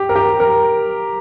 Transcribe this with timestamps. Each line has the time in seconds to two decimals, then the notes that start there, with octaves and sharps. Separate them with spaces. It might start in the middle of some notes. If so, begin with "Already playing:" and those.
Already playing: G4
0.09 A#4
0.16 G4
0.40 A#4